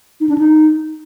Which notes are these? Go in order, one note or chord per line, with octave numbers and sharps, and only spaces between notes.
D#4
D4
D#4